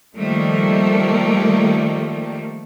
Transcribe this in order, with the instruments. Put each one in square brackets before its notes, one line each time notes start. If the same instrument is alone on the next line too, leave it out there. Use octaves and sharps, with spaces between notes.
[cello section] D#3 F3 G3 A3 A#3